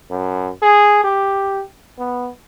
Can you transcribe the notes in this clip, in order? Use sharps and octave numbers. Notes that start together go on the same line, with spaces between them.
F#2
G#4
G4
B3